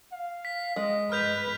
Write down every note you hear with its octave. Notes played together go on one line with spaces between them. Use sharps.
F5
B6
G#3 D#5
B4 F6 G6 F7